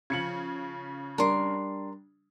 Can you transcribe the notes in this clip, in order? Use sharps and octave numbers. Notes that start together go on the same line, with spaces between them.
C#3 F3 G#6 C#7 F#7
G3 D4 A#4 C6